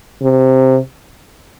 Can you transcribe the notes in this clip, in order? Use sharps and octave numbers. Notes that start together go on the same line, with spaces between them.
C3